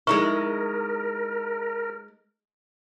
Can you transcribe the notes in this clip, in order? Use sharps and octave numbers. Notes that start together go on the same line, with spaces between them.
G#3 D#4 E4 A#4 C#6